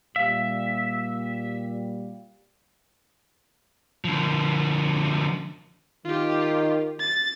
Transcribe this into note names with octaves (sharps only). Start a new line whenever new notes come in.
A#2 G3 E5 F5
D3 F3
D#3 F4 G4
A6